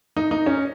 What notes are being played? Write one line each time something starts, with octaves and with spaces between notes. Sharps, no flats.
D#4
D#4
C#4